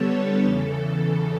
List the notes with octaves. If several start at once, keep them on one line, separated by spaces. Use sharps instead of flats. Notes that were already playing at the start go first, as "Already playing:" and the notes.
Already playing: D3 G3 B3 A4 C#5 A5
E2 C#3 E3